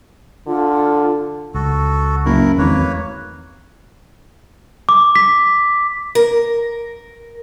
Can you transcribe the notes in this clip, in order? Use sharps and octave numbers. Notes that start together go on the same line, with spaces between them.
D3 F4
C#2 F#4 A4
F#1 E4 A#4
G#1 E2 D#3 A3 A#3 B4 C#5
D6
B6
A#4